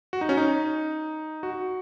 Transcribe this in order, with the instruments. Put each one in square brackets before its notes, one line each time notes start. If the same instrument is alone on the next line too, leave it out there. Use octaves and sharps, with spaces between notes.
[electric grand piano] F#4
D#4
C#4
D#4
F#4